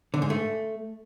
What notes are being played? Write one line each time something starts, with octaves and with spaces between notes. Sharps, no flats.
D3
G#2
A3